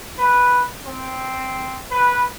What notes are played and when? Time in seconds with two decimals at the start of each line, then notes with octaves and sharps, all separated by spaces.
0.18 B4
0.86 C4
1.91 B4